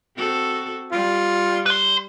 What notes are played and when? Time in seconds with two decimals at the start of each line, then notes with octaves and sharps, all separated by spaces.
0.16 C4 F#4 A4
0.92 G3 F4
1.66 B4 C6